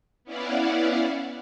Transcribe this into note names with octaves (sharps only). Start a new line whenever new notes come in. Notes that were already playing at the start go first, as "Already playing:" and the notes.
B3 C#4 E4 D5 F5 F#5